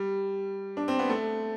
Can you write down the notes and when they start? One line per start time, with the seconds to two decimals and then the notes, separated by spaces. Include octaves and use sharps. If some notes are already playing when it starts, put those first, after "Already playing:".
Already playing: G3
0.77 D4
0.88 C4
0.99 B3
1.09 A3